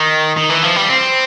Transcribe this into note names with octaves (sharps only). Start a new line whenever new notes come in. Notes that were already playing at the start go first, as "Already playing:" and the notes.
Already playing: D#3
D#3
E3
F3
G3
C4